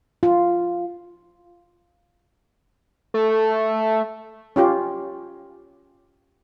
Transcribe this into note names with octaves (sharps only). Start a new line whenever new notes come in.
F4
A3
C#4 F4 G4